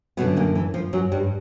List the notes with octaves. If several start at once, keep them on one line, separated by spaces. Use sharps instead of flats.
F#2 B2 D3 B3
A#2 A#3
E3
F3
F#2 F#3
G2 G3